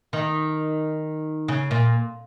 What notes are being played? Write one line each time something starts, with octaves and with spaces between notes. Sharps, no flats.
D#3
C#3
A#2